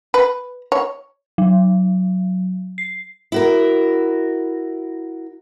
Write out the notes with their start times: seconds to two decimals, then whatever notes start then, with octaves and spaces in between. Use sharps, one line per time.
0.14 B4
0.72 C#5
1.38 F#3
2.78 C7
3.32 E4 F#4 A#4